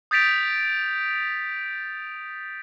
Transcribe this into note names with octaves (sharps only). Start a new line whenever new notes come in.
D#6 G6 A6 B6 D7 F7